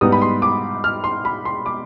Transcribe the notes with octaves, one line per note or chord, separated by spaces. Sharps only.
G#2 G3 B3 D#4 D#6
B5
C6
D6
F6
C6
B5
C6
D6